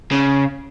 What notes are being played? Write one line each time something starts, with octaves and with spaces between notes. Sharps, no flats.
C#3